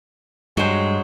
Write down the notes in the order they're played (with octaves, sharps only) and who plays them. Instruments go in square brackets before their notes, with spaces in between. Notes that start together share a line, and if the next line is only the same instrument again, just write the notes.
[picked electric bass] G2 [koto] F#3 C5 [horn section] G#3